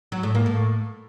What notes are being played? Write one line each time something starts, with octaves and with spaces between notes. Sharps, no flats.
F#3
A2
A#3
A2